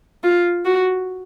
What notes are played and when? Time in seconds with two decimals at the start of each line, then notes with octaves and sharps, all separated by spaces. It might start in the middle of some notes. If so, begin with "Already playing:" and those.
0.24 F4
0.65 F#4